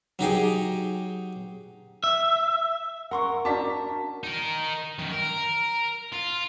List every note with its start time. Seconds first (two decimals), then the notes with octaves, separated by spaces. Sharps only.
0.19 F#3 D#4 G4 G#4
2.04 E5
3.11 C#4 A#4 F#5 C6 C#6
3.45 C#4 D4 F#4 A#4 D5 A5 D6 B6
4.24 D#4 A#4
4.99 F#2 D#3
5.12 A#4
6.12 F4